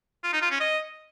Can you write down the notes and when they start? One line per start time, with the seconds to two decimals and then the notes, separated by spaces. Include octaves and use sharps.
0.24 F4
0.33 D#4
0.42 F4
0.51 C#4
0.60 D#5